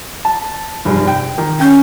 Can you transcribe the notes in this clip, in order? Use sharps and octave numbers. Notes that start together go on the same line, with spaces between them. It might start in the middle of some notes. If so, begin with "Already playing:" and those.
A5
F1 G2 G#4
G5
D#3
C#4 G5 G6